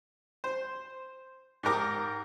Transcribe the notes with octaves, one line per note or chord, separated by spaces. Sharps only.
C5
G#2 G4 A#4 D6